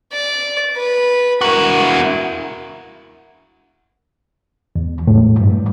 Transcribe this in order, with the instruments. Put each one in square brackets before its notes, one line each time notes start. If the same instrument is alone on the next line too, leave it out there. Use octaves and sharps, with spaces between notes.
[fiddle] D5
B4
[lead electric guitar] E4 F#4 [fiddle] A#4
[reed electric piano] E2
A2
G2